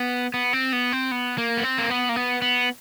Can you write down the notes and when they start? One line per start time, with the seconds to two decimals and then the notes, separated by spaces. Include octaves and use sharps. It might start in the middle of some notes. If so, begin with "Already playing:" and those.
Already playing: B3
0.34 B3
0.53 C4
0.73 B3
0.92 C4
1.11 B3
1.38 A#3
1.57 B3
1.63 C4
1.78 A#3
1.90 B3
2.09 A#3
2.16 B3
2.42 B3